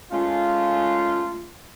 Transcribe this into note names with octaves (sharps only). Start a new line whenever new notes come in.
G#3 A3 C#4 F4